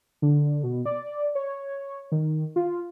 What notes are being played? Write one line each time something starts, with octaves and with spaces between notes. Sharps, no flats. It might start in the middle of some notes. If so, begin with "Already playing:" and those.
D3
B2
D5
C#5
D#3
F4